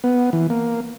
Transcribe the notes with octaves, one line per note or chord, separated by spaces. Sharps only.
B3
E3
A#3